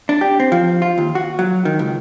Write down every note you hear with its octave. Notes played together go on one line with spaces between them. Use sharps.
D4
G4
C4
F3
F4
D#2
F#4
F#3
D#3
C#2